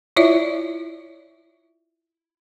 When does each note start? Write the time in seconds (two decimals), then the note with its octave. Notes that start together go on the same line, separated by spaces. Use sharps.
0.17 E4 F4 C#5 D5 E5